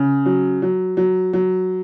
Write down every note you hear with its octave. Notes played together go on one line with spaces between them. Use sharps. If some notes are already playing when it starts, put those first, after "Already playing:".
Already playing: C#3
F#3
F#3
F#3
F#3